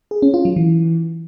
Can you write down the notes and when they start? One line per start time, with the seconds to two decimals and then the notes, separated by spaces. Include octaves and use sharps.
0.11 G#4
0.22 C#4
0.34 F4
0.45 F#3
0.56 E3